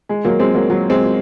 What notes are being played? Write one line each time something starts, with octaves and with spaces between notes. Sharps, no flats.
G#3
F#3 A#3
G#3 C4
F#3 A#3
F#3
G#3 C4